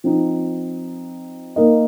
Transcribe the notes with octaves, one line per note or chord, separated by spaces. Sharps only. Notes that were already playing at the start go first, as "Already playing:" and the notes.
F3 C4 D#4
A#3 D#4 A#4 D#5